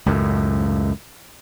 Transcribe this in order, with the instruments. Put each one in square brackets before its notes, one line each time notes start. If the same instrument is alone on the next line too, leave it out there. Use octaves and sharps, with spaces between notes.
[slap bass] C#2 F#2 A2